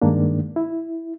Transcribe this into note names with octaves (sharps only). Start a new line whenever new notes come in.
G2 D#3 G#3 A#3 D4
E4